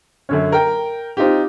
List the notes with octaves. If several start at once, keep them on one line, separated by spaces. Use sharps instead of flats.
F#2 D3 C#4
A#4 G5
C4 D#4 F4 G4